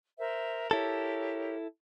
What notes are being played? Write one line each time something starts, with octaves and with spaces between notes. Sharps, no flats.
A#4 C5 E5
E4 G4 A4 A#4 C#5